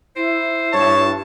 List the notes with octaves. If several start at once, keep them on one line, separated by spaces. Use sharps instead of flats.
E4 C5
G2 C#5 A5